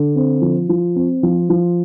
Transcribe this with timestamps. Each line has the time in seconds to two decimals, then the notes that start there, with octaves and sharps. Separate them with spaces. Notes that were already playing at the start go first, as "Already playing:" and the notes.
Already playing: D3
0.16 C4
0.41 F3
0.69 F3
0.96 C4
1.23 F3
1.50 F3